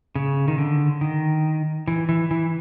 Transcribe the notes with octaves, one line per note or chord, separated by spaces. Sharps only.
C#3
D#3
D3
D#3
E3
E3
E3